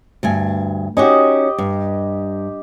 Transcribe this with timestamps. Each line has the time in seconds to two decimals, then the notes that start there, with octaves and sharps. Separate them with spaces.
0.23 D2 G2 G#5
0.97 C#4 D#4 F#4 G4 D#5
1.58 G2